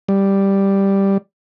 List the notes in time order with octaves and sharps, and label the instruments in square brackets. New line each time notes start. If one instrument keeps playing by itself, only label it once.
[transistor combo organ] G3